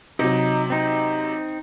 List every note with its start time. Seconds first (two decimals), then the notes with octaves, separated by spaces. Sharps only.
0.19 C3 F#3 D#4
0.70 C4 D#4